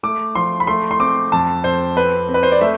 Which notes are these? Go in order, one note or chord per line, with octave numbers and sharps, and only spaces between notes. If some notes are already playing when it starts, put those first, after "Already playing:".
A3 D6
F3 C6
B5
A3 C6
C6
C4 D6
F2 A5
F2 C5
C4 B4
C4
B4
C5
D5
A3 E5